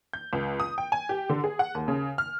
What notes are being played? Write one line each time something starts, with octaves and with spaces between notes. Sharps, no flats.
G6
C#2
D#6
G5
G#5
G4
D3
G#4
F#5
D#2
C#3
F6